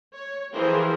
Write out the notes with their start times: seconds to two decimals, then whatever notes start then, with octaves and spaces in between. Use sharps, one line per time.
0.14 C#5
0.54 E3 F3 G4 G#4 A#4 C5